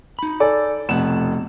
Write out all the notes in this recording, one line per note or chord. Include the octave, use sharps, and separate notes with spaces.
D#4 B5
A4 D5 G#5
F1 B2 A3 F#5 E7